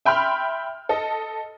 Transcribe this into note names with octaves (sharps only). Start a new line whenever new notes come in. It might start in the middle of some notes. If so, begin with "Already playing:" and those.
E5 G5 B5 C6 F6
A4 D#5